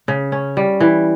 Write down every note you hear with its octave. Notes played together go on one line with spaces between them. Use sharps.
C#3
C#4
G3
E3